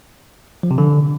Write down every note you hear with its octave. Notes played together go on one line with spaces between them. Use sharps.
F3
C3
D3